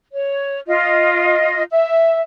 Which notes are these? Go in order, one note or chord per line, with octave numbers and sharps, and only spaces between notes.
C#5
F4 D#5
E5